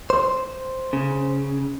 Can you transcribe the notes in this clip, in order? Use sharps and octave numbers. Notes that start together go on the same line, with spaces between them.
C5
C#3